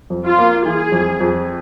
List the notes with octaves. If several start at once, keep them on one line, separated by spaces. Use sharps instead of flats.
F2
F4
A#3
E3 G#4
F2
F2